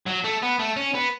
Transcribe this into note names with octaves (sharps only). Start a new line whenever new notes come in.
F#3
A3
B3
A3
C#4
B3